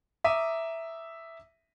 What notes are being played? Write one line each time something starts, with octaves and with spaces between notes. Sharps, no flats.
E5 A#5 D6 D#6 B6 D#7